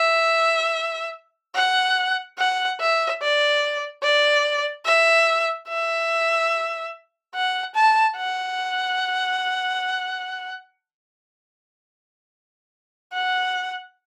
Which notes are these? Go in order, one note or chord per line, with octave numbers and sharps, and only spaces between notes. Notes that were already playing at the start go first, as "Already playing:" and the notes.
Already playing: E5
F#5
F#5
E5
D5
D5
E5
E5
F#5
A5
F#5
F#5